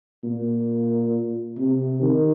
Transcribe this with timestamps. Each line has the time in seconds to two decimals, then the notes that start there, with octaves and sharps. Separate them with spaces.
0.24 A#2
1.58 C3
2.02 D#3